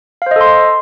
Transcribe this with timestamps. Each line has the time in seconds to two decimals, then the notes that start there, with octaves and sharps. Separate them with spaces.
0.22 F5
0.26 C5
0.31 D#5
0.36 A4
0.41 C6